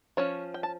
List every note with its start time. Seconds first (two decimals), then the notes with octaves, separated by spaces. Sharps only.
0.17 F3 C#4 C#5
0.54 G5
0.63 A5